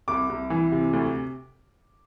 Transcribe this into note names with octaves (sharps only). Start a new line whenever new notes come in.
C2 D6
C2
E3
C3
D2